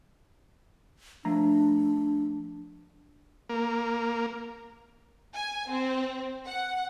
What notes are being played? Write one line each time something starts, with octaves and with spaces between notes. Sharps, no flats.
F3 A3 D4 A#5
A#3
G#5
C4
F#5